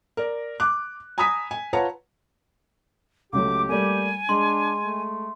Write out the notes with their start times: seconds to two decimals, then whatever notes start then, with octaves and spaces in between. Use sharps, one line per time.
0.17 A#4 D5
0.60 D6 F#6
1.18 G#5 A#5 B5 D#6 E6 B6
1.51 G#5
1.73 F4 B4 C#5 F#5 A5 A#5
3.33 C#2 F#3 A3 G4 D6
3.69 G3 A3 A#3 G#5
4.29 G#3 D4 C6
4.83 A3